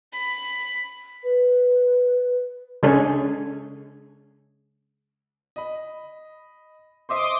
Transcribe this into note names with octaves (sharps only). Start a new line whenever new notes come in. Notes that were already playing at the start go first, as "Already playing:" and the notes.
B5
B4
C#3 G#3 D4 G#4 A4 C#5
D#5 B5
C5 D#5 E5 C6 D6 D#6